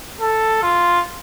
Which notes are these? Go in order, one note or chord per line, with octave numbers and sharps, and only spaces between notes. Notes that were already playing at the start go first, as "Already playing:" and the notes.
A4
F4